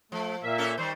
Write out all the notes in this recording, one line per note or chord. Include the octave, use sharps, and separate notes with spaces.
F3 A3
A#2 A#3 E5
C#4 A4 A#4
D#3 G3 C5